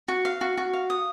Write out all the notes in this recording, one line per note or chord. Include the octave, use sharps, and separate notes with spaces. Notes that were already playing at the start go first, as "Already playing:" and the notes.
F#4
F5
F#4
F#4
F5
D#6